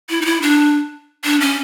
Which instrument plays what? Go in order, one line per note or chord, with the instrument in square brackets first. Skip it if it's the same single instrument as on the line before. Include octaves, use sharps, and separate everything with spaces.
[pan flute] E4
D#4
E4
D4
D4
C#4